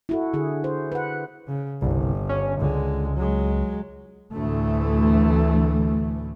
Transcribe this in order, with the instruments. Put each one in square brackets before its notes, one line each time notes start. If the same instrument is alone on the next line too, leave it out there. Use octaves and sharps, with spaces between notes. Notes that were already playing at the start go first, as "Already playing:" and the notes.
[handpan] E4 F#4 A4
D3 G#4
C5
B4 F#5
[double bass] C#3
[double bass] G1 [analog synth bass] C2
[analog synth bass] C#4
[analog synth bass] C#2 [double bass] D3 G#3
[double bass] F#3 G#3
[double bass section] D2 A2 E3 A3